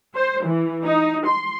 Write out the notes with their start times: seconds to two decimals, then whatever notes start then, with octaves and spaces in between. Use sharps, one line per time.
0.15 C5
0.46 E3
0.84 D#4
1.27 C6